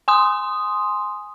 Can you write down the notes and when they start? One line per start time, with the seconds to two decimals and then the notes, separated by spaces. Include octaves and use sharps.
0.08 G#5 C6 D#6